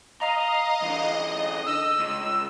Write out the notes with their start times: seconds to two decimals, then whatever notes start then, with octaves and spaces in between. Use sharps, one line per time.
0.21 D#5 F5 A#5
0.82 D3 E3
1.66 E6
1.99 C#2